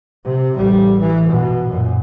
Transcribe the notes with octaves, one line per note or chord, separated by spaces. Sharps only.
C3
A1 G3
E3
B2
F#2 A#2